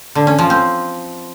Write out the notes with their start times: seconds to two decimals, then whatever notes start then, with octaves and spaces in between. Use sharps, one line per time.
0.15 D3
0.27 C#4
0.38 F3
0.50 C4